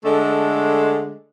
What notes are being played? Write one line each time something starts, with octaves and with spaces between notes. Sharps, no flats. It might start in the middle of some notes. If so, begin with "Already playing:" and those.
D3 G#3 A3 D4 A4